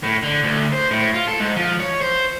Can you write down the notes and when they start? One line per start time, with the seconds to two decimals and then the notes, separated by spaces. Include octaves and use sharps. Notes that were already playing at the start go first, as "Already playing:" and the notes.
0.03 A2
0.23 D3
0.44 D2
0.73 C5
0.91 A2
1.14 F4
1.27 A4
1.40 G#2
1.56 F3
1.80 C#5
2.01 C5